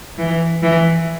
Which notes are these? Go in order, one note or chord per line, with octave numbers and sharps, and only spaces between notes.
E3
E3